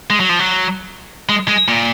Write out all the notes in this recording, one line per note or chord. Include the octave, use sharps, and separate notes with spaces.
G#3
F#3
F3
F#3
G#3
G#3
A#2